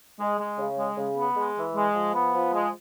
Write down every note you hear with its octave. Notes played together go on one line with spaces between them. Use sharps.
G#3
G#3
C#3
G#3
C#3
B3
G#3
E3
G#3
F3
B3
F3
G#3